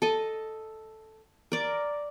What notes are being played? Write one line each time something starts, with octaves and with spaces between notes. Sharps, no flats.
A4 D#5
A#4 D5